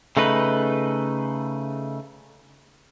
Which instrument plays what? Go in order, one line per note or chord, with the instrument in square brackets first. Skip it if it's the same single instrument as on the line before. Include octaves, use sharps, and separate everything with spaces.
[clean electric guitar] C#3 A3 D#4 B4